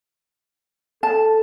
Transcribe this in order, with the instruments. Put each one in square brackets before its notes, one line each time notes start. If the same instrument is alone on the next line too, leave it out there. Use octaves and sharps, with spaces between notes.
[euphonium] A4 [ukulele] A5